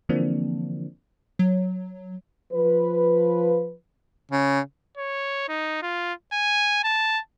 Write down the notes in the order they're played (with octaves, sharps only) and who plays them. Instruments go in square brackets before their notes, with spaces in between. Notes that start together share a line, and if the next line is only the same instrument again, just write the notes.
[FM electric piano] D3 E3 F3 A#3 C4 D4
[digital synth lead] F#3
[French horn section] F3 B4
[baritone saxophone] C#3
[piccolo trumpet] C#5
D#4
F4
G#5
A5